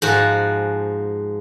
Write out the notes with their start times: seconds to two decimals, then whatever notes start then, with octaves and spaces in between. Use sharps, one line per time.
0.02 G#2 F3 F#4